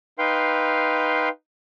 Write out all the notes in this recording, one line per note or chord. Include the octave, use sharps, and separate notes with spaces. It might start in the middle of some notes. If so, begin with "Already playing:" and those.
D#4 B4 F5 G5 C6